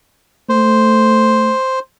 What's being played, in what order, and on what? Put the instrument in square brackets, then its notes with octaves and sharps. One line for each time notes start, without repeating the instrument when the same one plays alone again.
[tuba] A3 [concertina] C5